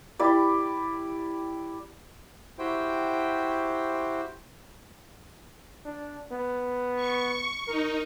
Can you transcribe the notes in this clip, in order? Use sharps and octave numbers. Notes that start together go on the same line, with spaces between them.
E4 G4 D5
E4 F#4 G4 C5 G5
D4
B3
C#6
D#4 A#4